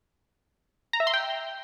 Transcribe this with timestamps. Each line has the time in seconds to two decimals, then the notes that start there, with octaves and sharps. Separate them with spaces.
0.93 A#5
1.00 E5
1.07 C6
1.14 G5